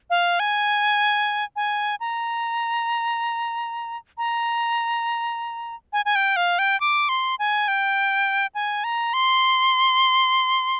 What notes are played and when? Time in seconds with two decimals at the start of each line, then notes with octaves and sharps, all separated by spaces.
0.10 F5
0.40 G#5
1.56 G#5
2.00 A#5
4.18 A#5
5.93 G#5
6.05 G#5
6.15 G5
6.36 F5
6.59 G5
6.80 D6
7.09 C6
7.39 G#5
7.68 G5
8.55 G#5
8.84 A#5
9.14 C6